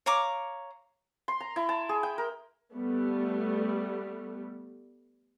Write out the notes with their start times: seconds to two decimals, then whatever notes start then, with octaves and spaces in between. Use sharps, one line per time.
0.06 C#5 F5 A#5 D6
1.28 C6
1.40 A#5
1.56 E4
1.69 A5
1.89 G#4
2.03 G5
2.18 A#4
2.73 G3 A3 B3